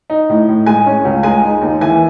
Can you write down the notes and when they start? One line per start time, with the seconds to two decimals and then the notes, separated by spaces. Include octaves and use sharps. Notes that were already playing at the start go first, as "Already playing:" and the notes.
0.10 D#4
0.29 A2
0.49 A2
0.66 G#3 G#5
0.86 C#4
1.05 C#2
1.23 G#3 G#5
1.43 D#4
1.61 D#2
1.81 E3 G#5